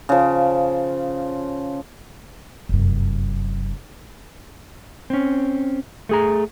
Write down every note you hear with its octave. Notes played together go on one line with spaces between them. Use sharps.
C#3 F3
F1 F#2
C4 C#4
A3 G#4 A#5